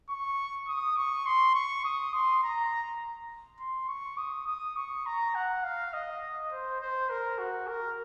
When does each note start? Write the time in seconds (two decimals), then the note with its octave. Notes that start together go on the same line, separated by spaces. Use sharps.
0.09 C#6
0.68 D#6
0.97 C#6
1.26 C6
1.55 C#6
1.85 D#6
2.14 C6
2.43 A#5
3.60 C6
3.88 C#6
4.17 D#6
4.47 D#6
4.76 C#6
5.06 A#5
5.35 F#5
5.64 F5
5.93 D#5
6.51 C5
6.81 C5
7.09 A#4
7.38 F#4
7.68 A#4